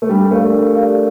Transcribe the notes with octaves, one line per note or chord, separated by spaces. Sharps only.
A3
G3 D4
A3 G4 A#4 D5 F5
D4
G4 A#4 D5 F5